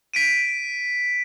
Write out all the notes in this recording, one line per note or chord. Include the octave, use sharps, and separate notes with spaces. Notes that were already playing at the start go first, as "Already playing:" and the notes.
B6 D7 D#7